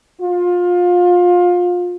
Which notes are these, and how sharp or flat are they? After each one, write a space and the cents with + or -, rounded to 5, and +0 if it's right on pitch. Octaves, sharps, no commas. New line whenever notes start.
F4 +25